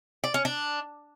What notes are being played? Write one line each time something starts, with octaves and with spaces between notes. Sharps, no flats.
D5
C#4
D4